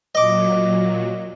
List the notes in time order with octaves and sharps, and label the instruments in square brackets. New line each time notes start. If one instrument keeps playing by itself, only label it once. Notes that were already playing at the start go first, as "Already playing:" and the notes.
[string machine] A#2 F#3 [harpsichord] D#5 D6